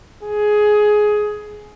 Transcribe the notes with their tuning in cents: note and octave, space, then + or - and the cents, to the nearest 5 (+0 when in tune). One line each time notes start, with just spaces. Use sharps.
G#4 +15